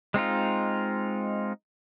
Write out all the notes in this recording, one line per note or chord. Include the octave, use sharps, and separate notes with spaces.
G#3 C4 D#4 F4